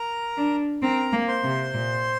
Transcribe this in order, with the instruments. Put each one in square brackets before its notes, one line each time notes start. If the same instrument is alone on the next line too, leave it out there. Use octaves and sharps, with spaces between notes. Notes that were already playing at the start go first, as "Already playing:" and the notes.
Already playing: [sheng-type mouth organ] A#4 A#5
[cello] D4
[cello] C4 [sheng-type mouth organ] A#4 A#5
[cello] A#3
[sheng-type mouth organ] C5 C6
[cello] C3
A#2